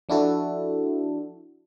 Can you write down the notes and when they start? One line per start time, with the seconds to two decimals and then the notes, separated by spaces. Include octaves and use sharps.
0.09 F3 D4 E4 F#4 A4